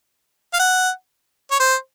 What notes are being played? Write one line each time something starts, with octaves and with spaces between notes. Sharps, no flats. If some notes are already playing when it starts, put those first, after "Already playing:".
F5
F#5
C#5
C5